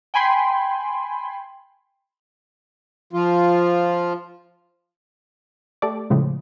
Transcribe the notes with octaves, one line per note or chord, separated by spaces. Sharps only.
G5 G#5 B5 C6
F3 F4
A3 G4 A4 D5 D6
A2 C#3 F3 G#3